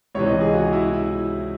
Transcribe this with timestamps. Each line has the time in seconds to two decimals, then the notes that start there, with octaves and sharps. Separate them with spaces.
0.15 C#2 C3 E3 C#5
0.27 D#5
0.41 G#4
0.54 F#4
0.73 E4
0.93 E4